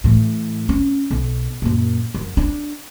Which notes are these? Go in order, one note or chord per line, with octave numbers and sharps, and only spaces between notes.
A2 E3
C#4
B1
F#2 A#2
F#2
D4